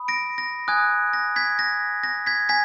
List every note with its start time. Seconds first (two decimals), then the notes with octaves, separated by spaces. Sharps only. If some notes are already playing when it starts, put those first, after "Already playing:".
Already playing: B5 D#6
0.08 A#6 D7
0.38 A#6
0.68 G#5 D#6 F#6 G#6
1.13 A#6
1.36 G#6 B6
1.59 A#6
2.03 A#6
2.26 G#6 B6
2.49 G#5 G#6 B6